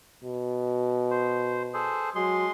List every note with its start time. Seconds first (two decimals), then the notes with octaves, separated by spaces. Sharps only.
0.24 B2
1.11 C5
1.74 G#4 A4 C5
2.16 F#3 G#3 G#4 C6